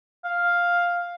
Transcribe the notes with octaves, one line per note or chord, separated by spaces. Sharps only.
F5